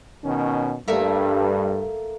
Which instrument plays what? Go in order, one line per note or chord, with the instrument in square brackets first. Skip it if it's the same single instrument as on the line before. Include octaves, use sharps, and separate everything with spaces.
[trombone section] B2 D#3 C#4
[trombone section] G2 [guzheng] A3 A#3 E5